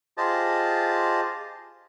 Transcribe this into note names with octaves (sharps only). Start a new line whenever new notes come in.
F4 G4 G#4 C5 D#5 A5